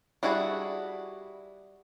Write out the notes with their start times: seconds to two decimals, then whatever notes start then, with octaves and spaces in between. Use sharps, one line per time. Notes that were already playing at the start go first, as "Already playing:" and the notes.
0.23 G3 D4 E4 F#4 G#4